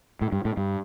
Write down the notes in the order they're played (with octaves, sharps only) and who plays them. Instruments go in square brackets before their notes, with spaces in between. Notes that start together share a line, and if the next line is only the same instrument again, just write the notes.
[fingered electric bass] A2
G2
A2
G2